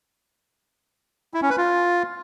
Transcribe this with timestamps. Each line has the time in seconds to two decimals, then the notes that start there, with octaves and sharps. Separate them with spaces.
1.34 E4
1.42 C#4
1.50 B4
1.58 F4